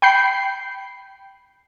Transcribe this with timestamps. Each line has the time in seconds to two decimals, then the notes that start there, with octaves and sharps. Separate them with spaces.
0.02 G5 B5 G6 C7